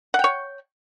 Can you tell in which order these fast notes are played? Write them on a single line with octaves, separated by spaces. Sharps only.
F#5 G5 C#5